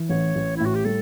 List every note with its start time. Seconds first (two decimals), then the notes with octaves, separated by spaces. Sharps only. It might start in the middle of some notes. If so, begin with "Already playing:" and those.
Already playing: E3
0.10 A1 C#5
0.35 A1
0.56 A2 E4
0.66 F#4
0.75 G4
0.85 G3 A4